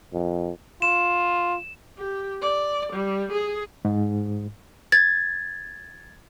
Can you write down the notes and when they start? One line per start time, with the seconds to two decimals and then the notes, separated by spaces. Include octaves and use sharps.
0.13 F2
0.82 F4 E7
1.98 G4
2.42 D5
2.93 G3
3.32 G#4
3.85 G#2
4.92 G#6 A6